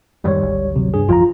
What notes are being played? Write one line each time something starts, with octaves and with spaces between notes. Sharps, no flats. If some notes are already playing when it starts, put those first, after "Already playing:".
F2 G#2 D#3 G3 C#5
G#1 D2
C3 F#3
G2 G#4
A1 F2 F3 F4 A#5